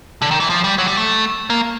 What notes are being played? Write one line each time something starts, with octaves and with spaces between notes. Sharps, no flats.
D3
D#3
E3
F3
G3
F#3
G3
A3
A#3